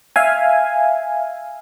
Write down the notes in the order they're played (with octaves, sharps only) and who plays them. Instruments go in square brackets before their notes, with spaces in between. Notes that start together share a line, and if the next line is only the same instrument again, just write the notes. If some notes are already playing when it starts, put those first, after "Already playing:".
[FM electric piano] E5 F5 G#5